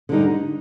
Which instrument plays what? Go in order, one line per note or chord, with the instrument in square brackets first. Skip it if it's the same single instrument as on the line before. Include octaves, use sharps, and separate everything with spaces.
[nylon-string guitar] D3 G3 D#4